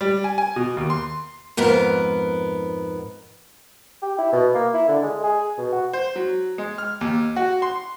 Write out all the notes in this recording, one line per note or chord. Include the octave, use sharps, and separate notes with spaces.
G3
G#5
G#5
B2
D#2
C6
F2 G#2 B3 A#4
G4
E4
B2
A#3
E4
D3
G#3
G#4
B2
F#4
C5
F#3
G#3
F6
D#2
F#4
C6